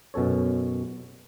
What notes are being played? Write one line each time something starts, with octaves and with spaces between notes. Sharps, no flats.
F#2 B2 C#4 A4 C#5